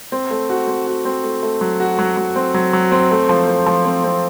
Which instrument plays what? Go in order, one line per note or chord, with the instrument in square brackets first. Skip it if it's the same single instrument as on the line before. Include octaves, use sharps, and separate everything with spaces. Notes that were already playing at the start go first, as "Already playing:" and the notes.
[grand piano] C4
A3
F#4
C4
F#4
C4
A3
A3
F#3
F#4
F#3
F#3
C4
F#3
F#3
C4
A3
F3
C4
F3
C4
C4